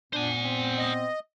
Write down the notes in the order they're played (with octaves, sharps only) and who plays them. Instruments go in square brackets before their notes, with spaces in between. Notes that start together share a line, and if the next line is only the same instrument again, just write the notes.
[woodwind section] A#2 B3 [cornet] D4 [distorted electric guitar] C5 G#5
[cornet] C4
[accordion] D#5